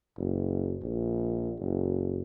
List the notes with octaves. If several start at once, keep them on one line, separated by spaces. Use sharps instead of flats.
F#1
A#1
F#1